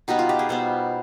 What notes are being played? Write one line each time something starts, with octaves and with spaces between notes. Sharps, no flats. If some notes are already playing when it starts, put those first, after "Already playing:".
B2 G3 B3 D#4
F4
G4
G#4
B2 G3 B3 C5